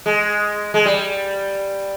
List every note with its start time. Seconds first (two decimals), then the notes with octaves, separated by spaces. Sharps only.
0.06 G#3
0.74 G#3
0.86 G3